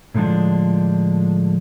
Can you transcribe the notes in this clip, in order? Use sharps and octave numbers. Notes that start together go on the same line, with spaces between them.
A2 D3 F3 G#3 D4